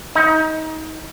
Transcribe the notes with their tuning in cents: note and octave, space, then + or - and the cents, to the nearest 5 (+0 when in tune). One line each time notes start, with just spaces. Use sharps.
D#4 +25